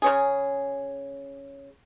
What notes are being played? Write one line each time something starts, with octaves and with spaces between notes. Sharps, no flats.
C#3 C#4 G#4